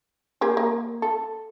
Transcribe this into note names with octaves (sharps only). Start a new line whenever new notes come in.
A#3 G4 G#4
A#3
A4